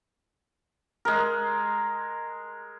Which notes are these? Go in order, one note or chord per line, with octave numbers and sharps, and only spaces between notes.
G#3 A#4